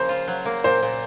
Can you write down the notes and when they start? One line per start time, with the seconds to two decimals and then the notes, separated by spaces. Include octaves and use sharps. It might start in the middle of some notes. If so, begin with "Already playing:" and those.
Already playing: C#3 F3 A#3 C5
0.09 F4
0.28 F#3
0.45 A#3
0.64 A#2 C5
0.83 A#2